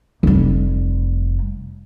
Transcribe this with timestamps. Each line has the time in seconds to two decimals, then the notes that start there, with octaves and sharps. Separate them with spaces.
0.23 F1 G3